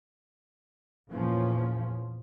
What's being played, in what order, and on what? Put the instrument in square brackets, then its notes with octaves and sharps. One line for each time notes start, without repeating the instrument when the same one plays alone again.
[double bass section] E2 A#2 F3 C#4